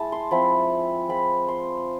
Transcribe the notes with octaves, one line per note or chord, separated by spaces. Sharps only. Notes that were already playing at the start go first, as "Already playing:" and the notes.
Already playing: G#3 E4 A5
C6
F3 G#3 C4 E4 B5
G#3 C4 F4 B5
C6